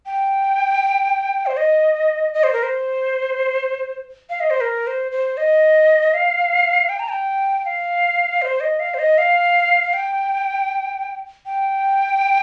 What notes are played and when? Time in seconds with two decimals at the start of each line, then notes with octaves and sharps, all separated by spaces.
0.06 G5
1.46 C5
1.57 D#5
2.34 D#5
2.43 C5
2.53 A#4
2.63 C5
4.30 F5
4.40 D#5
4.50 C5
4.61 A#4
4.87 C5
5.12 C5
5.37 D#5
6.14 F5
6.89 G5
6.99 A#5
7.10 G5
7.65 F5
8.42 C5
8.60 D#5
8.79 F5
8.94 C5
8.99 D#5
9.18 F5
9.93 G5
11.46 G5